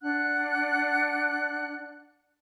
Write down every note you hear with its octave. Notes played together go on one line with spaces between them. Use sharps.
D4 F#5 F#6